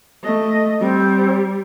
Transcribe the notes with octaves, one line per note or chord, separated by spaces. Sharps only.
A3 D#5
G3 C4